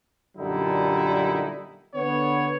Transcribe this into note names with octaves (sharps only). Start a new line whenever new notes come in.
F#2 A#2 D3 G3 D#4 E4
D3 B3 C#5